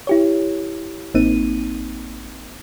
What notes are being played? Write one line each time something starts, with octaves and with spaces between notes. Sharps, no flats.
E4 G4 C#5
A1 A#3 C4 D#4 D#7